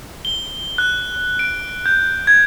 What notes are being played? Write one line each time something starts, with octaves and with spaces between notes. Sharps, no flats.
G7
F#6
D7
G6
G#6